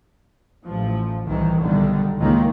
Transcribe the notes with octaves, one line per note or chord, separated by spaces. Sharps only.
A1 F3
C2 D#3 E3
B1 D3 D#3 G3
C#2 D#3 A#3